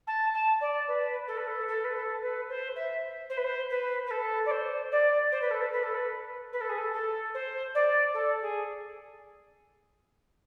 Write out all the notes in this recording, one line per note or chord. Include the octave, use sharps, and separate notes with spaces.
A5
A5
D5
B4
A4
B4
A4
A4
B4
A4
B4
C5
E5
C5
B4
C5
B4
B4
A4
D5
C5
D5
C5
B4
A4
B4
B4
A4
B4
B4
A4
G#4
A4
A4
C5
D5
A4
G#4